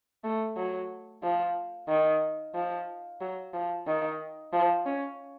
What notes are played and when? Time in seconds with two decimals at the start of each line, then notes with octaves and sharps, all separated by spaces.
0.24 A3
0.57 F#3
1.23 F3
1.89 D#3
2.55 F3
3.21 F#3
3.54 F3
3.87 D#3
4.53 F3
4.86 C#4